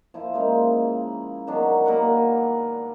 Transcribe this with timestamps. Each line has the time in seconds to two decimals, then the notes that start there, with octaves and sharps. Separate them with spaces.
0.14 F3 E4 C5
0.34 C#3 G#3 A#3
1.47 D#3 F#3 B3 D4
1.86 A#2 G3 A#4 F#5